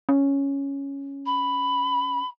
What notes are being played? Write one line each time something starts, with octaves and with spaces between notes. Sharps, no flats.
C#4
B5